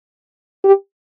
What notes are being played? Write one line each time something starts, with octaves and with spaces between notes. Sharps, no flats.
G4